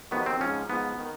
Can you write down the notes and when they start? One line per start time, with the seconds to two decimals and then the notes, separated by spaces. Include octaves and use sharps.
0.11 F2 C3 D#3 F#3 B3
0.26 C4
0.41 G#2 F3 C#4
0.69 G#2 F3 B3
1.00 D#3